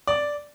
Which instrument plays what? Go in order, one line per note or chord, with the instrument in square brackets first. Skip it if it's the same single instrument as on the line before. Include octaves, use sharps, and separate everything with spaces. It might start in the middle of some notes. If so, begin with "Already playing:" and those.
[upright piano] D5